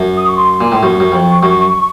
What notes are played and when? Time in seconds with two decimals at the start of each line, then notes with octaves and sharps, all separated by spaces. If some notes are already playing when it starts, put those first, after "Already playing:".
Already playing: F#2
0.17 D#6
0.27 C#6
0.37 C6
0.61 A#2
0.72 A2
0.82 F#2 C#6
1.00 F#2
1.12 F2
1.43 F#2